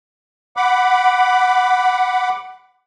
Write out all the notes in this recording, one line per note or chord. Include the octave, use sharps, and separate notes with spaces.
F#5 B5 D6